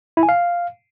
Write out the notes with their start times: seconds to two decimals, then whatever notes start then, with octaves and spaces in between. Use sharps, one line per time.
0.17 E4
0.23 G#5
0.29 F5